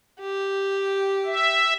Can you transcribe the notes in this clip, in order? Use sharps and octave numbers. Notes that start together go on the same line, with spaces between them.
G4
E5